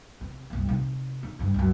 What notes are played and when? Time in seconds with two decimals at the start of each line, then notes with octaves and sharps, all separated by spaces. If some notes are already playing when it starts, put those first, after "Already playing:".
0.21 C3
0.50 F#1 C2
0.69 C3 D#4
1.23 D#4
1.39 G2 C#3
1.54 C#2 F#2